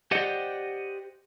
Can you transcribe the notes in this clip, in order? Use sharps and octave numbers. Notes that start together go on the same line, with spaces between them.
G4 C5 D5 D#5 F#5 G5